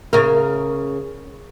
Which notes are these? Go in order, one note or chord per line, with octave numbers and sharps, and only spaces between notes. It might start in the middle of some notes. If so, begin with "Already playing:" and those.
C#3 A#4